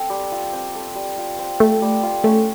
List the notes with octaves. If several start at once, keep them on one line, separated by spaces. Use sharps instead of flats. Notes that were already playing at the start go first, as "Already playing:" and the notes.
Already playing: C4 A4
G3
F4
C4
A4
G3
F4
C4
A3 A4
G3
F4
A3 C#4